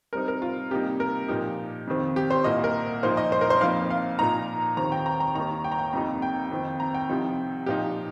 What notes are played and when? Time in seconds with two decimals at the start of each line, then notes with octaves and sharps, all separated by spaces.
0.13 C3 G3 C4 D#4 A#4
0.28 A#4
0.42 F4
0.71 C3 G3 A#3 D#4 G4
1.00 A#4
1.28 A#2 F3 D#4 G4
1.87 F2 C3 D#3 C4
2.16 G4
2.31 C5
2.44 C2 A#2 A#3 D#5
2.64 A#4
3.03 A#2 F3 A#3 D#4 C5
3.17 D#5
3.32 C5
3.41 A#4
3.50 C5
3.61 F2 F3 A#3 D#4 F5
3.90 F5
4.19 A#2 F3 D#4 A#5
4.77 D#2 D#3 C4 A#5
4.92 G5
5.06 A#5
5.20 A#5
5.35 D#2 D#3 A#3 D#4 A#5
5.64 G5
5.72 A#5
5.79 G5
5.93 F2 C3 F3 A#3 D#4 A#5
6.22 G5
6.51 F2 D#3 C4 D#4
6.80 A#5
6.94 G5
7.09 C2 C3 F3 D#4
7.66 A#2 F3 D#4 G4